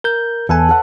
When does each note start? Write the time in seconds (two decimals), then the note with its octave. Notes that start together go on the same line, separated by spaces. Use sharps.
0.04 A#4 G6
0.49 E2 A4 B4 G#5
0.69 A4 F#5